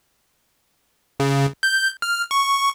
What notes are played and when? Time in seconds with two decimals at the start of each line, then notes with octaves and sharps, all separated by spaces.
1.20 C#3
1.63 G6
2.02 F6
2.31 C#6